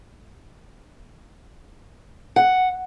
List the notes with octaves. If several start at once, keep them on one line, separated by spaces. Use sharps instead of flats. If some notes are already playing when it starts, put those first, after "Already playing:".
F#5